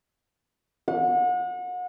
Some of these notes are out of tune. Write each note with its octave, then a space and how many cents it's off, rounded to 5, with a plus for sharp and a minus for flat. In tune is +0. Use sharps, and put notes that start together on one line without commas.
F#5 -35